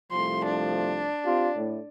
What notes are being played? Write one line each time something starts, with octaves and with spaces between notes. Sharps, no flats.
C2 F3 A3 C6
D4
C4 F4 G4
A2